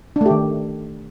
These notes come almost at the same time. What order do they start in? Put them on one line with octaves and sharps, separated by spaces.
D4 A3 G4 D#3